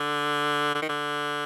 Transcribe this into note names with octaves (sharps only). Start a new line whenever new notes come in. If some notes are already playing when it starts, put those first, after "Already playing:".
Already playing: D3
D3
D#3
D3